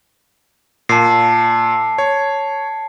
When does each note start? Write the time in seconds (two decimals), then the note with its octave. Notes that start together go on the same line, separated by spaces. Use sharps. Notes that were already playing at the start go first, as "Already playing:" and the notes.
0.89 A#2 A5 C7
1.98 C#5